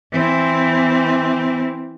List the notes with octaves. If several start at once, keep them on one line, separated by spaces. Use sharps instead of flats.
E3 C4